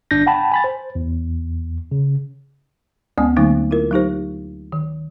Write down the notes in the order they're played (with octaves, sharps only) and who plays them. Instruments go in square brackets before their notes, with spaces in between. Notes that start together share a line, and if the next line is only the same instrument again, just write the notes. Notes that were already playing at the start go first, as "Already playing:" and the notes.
[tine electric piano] G1 D4 G6 A#6
F#5 G5 A5 B5
G#5 B5 A6
C5
E2
C#3
[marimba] D2 G#3 B3 C#4 G#5 D#6
D3 F#3 A3 A#3 D#4
E4 F4 A#4
F#3 D#4 G4 C5
D#3